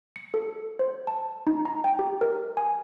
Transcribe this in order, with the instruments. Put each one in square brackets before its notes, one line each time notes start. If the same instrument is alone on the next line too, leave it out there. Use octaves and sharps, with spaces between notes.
[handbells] C#7
A4
C5
A5
D#4
A#5
G5
G4
A#4
G#5